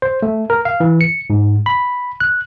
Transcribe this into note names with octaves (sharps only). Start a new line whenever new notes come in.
C5
A3
A#4
F5
E3
C#7
G#2
B5
F#6